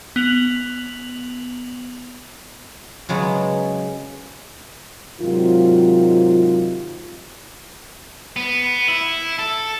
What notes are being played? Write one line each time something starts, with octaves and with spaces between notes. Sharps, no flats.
B3 F7 F#7
C#3 F#3 G#3 B3
G#2 C3 D#3 F#3 F4
B3
E4
A4